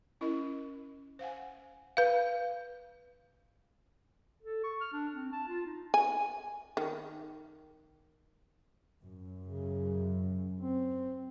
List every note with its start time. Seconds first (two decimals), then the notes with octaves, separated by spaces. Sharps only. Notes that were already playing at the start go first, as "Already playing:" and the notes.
0.21 C#4 E4 A#4 D#5 B5
1.19 C5 F5 F#5 G#5
1.97 B4 F5
4.43 A4
4.64 C#6
4.81 F6
4.93 D4
5.14 C4
5.32 A5
5.49 F4
5.66 D#4
5.94 G#5
6.77 D#3
9.04 F#2
9.44 C#3
10.61 C4